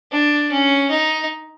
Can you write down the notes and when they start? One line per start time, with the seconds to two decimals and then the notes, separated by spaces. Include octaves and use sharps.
0.12 D4
0.51 C#4
0.90 D#4